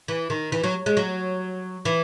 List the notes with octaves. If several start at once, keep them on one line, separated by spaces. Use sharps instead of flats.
E3
D#3
E3
F#3
G#3
F#3
E3